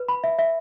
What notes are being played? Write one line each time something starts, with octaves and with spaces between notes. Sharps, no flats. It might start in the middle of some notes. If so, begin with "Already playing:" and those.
Already playing: B4
B5
E5
E5